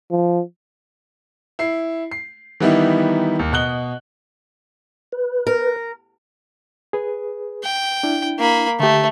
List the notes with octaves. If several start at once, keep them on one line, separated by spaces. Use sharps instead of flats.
F3
E4 C7
C7
D#3 E3 G3 B3 D#4 E4
D#2
B2 D#5 F#6 G7
B4
A#4
G#4 B4
G5
D4 E4
A#3 B5
D3 A3 G4